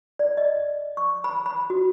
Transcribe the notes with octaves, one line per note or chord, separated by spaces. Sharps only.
D5
D#5
C#6
B5
B5
F#4